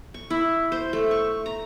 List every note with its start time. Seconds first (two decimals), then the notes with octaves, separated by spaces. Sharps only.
0.14 C#6
0.30 E4
0.72 C5
0.93 A3
1.11 C#6
1.46 A#5